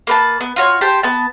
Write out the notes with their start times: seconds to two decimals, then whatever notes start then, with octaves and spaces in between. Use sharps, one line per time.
0.07 A#3 B4 A5
0.41 B3
0.56 F4 F#4 C#5
0.81 G4 C5 G5 A5
1.03 B3 A5